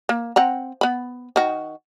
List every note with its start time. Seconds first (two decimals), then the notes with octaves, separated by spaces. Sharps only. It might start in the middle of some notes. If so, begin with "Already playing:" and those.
0.09 A#3
0.36 C4 F#5 A#5
0.81 B3 B5
1.36 D#3 F#4